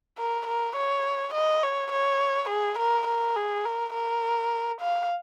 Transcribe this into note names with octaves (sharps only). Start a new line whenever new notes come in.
A#4
A#4
C#5
D#5
C#5
C#5
G#4
A#4
A#4
G#4
A#4
A#4
F5